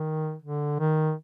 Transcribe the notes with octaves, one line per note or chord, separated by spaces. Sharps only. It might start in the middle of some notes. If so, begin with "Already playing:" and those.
Already playing: D#3
D3
D#3